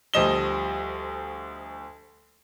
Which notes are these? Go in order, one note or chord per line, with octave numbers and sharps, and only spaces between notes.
D2 F3 G3 D#5 E7 G7